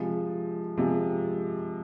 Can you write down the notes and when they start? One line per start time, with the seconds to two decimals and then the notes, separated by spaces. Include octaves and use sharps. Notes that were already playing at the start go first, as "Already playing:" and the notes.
Already playing: C3 F3 G#3
0.77 C3 F3 G#3